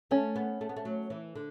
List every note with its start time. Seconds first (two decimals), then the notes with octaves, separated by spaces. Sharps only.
0.11 A3 C#4
0.36 B3
0.61 A3
0.69 B3
0.76 A3
0.85 F#3
1.10 E3
1.35 D3